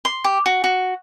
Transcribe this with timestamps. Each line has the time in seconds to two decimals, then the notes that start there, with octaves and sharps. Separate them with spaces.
0.05 C6
0.24 G4
0.46 F#4
0.64 F#4